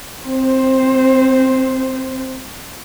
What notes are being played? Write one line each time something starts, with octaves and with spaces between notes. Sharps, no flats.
C4 C5